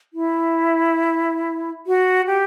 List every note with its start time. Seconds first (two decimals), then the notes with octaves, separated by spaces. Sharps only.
0.13 E4
1.87 F#4
2.27 G4